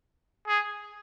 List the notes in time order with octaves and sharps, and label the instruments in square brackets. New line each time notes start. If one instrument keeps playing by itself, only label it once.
[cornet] G#4